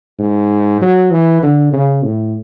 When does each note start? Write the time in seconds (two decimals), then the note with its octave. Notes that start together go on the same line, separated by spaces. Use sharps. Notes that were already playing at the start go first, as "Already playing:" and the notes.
0.19 G#2
0.81 F#3
1.11 E3
1.42 D3
1.73 C#3
2.04 A2